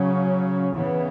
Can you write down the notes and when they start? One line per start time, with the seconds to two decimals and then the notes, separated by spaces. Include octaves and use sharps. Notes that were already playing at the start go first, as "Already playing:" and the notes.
Already playing: C#3 F#3 C#4
0.72 C#3 E3 B3